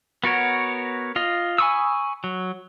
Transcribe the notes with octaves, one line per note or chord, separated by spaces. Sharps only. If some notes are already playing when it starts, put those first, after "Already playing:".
B3 F#4 A#4 C#5
F4 D#5
G#5 B5 C#6 D#6 E6
F#3